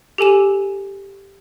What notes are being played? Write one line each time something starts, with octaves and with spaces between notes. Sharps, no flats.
G4 A4 G#5 E7